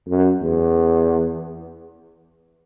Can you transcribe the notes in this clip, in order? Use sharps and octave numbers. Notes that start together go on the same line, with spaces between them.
F#2
E2